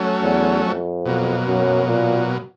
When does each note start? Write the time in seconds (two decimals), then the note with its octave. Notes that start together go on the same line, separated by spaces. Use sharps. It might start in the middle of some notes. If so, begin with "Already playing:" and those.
Already playing: F#3 A3 C#4
0.23 E2
0.64 F2
1.05 B2 F#3 A#3
1.47 F#2
1.88 A#2